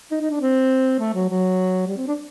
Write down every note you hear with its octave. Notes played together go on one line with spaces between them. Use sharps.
D#4
D#4
D4
C4
A3
F#3
F#3
G3
C4
D4